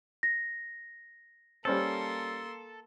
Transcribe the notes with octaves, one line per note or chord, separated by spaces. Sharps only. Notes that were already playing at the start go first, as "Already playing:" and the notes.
A#6
G3 A#3 C#4 A4 C5 C6